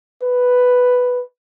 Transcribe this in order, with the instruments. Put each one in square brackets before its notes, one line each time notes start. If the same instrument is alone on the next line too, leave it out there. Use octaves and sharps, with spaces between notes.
[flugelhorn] B4